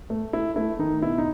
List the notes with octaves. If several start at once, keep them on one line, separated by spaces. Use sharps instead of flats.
A3
A3 E4
A3 E4
D#3 D#4
B2 E4
D#4